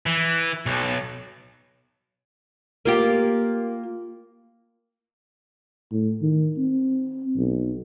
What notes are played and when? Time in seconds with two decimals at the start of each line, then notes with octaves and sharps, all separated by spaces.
0.06 E3
0.66 B1
2.85 A#3 F4 G4
5.92 A2
6.22 D#3
6.58 C4
7.37 B1